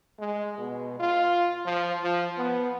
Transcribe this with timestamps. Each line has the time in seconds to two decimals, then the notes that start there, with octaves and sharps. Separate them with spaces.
0.19 G#3
0.58 B2
1.00 F4
1.66 F3
2.04 F3
2.38 B3